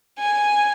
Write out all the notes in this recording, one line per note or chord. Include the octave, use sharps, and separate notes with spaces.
G#5